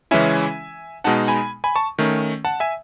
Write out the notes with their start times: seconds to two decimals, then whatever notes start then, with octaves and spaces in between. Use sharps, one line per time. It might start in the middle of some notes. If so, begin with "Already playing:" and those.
0.11 C#3 E3 G#3 C#4 E4 E5 G#5
1.04 B2 G#3 D#4 F#5 A5
1.28 G#5 B5
1.64 G#5 B5
1.75 A5 C#6
1.98 D#3 A3 C#4
2.45 F#5 A5
2.60 E5 G#5